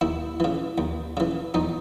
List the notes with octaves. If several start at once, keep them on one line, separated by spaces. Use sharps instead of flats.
D#2 E4
C#3 E3
D#2
C#3 E3
E2 D#4